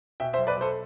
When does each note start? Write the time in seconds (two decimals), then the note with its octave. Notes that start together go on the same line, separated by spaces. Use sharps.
0.20 B2 E5 G5
0.33 C5 E5
0.39 B1
0.47 B4 D5
0.57 B1 A4 C5